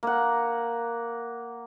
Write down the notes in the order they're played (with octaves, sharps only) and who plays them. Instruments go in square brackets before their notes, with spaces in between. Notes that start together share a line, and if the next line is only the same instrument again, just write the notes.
[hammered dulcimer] A#3 F#5